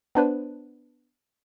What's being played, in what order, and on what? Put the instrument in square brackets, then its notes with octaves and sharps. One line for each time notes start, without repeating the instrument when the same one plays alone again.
[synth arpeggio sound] B3 D4 B4 C5